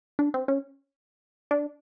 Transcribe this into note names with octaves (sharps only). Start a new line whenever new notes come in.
D4
C4
C#4
D4